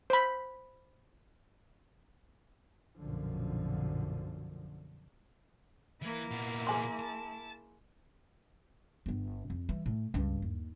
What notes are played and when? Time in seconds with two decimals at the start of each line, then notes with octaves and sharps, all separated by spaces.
0.10 C5 B5
2.98 B1 F#2 A#2 D3 F3
6.02 E3 A#3 E4
6.31 A#2 B3
6.67 G#4 G#5 C6
6.99 A5
9.06 G1 B3
9.50 F2
9.69 E3 G3
9.86 A2
10.14 C#2 G2
10.42 D#2